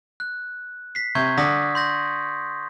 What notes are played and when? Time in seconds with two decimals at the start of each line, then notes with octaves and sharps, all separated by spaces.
0.20 F#6
0.95 B6 C7
1.15 C3 C#6 G6 G#6
1.37 D3 D#6 A#6 B6
1.75 C6 G6 A#6